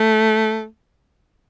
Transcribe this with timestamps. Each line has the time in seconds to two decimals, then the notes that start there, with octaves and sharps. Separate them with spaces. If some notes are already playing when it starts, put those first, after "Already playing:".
Already playing: A3